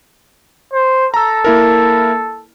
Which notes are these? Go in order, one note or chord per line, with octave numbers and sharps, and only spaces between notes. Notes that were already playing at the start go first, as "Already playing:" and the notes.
C5
A4 A#5 E6
A#3 E4 A#4